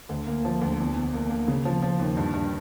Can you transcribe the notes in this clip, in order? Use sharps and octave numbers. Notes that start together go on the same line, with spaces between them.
D2
A#3
F3
D2
E2
E2
A#3
A#3
C#3
F3
F3
D#2
G2
G2